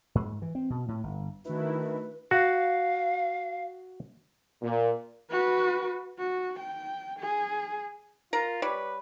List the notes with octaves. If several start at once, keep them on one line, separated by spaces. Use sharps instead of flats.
G#2
E3
C4
B2
A2
G1
D#3 A3 D4 E4 F#4 B4
F#4 F5
A#2
F#4 B4
F#4
G5
G#4
F4 A#4 A#5
G3 B4 C#5 D5